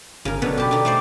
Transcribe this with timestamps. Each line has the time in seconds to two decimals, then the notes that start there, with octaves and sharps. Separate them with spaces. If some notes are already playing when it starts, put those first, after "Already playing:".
0.25 G1 C#3 A#4
0.42 B2 D3 F#3 B3 A4
0.57 B2 G4 G5 A5 B5
0.71 D4 D#4
0.85 A3 C5 D5